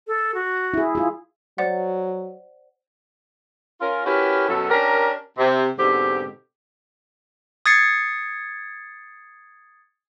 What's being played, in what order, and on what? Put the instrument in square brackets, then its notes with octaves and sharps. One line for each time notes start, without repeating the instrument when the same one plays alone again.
[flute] A4
F#4
[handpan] E4 G#4
F4 G#4
[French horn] F#3 [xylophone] C5 D5 F#5
[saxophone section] C#4 F4 A#4
C#4 E4 F#4 G4 A#4 B4
F#2 B2 C#4 A4
C#4 D4 G4 A#4
C3
G#2 B2 D3 C4 G4
[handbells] D#6 G#6 A6 C7 C#7